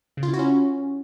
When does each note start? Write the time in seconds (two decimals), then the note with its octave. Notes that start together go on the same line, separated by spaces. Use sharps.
0.17 C#3
0.23 F4
0.28 E4
0.34 F#4
0.39 C#4